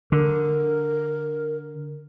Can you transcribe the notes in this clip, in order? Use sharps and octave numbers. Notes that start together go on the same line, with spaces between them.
D3 A#4